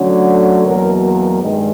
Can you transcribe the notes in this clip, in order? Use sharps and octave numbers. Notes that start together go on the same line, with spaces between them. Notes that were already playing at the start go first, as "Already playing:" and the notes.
Already playing: D3 F#3 A3 C#4
A4
E2 B2 F#3 A#3 A#4
A#4
G2 D#3 G#3